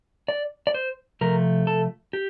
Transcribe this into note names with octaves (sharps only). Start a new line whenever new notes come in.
D5
D5
C5
C3 F3 A3 A#4
A4
G4